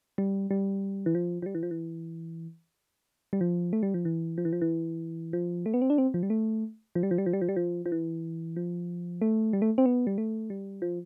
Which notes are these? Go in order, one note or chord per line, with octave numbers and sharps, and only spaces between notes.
G3
G3
E3
F3
F3
G3
E3
F3
E3
G3
F3
A3
G3
F3
E3
F3
E3
F3
E3
F3
A3
B3
C4
D4
C4
F3
G3
A3
F3
G3
F3
G3
F3
G3
F3
G3
F3
F3
E3
F3
A3
G3
A3
C4
B3
G3
A3
G3
F3